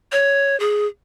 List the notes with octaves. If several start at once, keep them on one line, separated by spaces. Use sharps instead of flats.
C#5
G#4